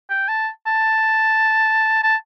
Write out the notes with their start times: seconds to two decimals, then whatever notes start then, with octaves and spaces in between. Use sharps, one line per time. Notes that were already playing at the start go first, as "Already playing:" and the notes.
0.10 G5
0.28 A5
0.67 A5
2.03 A5